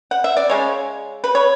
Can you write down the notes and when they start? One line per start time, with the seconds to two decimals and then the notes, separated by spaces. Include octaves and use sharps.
0.11 F#5
0.24 E5
0.37 D5
0.50 C#3 G#3 C#5
1.24 B4
1.35 C#5